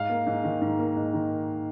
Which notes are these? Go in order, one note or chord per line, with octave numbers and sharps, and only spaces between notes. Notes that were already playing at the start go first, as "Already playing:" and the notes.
Already playing: G#2 F5
A#3
G#2
D#3
G#2
A#3
G#2
D#3